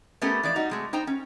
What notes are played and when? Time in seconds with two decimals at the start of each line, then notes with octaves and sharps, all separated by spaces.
0.22 A3 B3 C#4 G4 A4 A#4
0.43 E3 F3 D5
0.56 G3 D#4 F#4
0.70 C3 G#3 A3
0.93 D#4 C5 G5 A#5
1.07 C#4